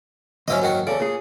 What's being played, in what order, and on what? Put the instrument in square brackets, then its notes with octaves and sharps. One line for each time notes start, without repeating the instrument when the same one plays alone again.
[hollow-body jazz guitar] D#2 G#2 F#3 [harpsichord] C#4 E4 D#5
[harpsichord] F#2 D#3 F#4
[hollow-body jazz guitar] E2 A4 D5 [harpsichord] C#3
[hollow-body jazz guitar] A#2 G#4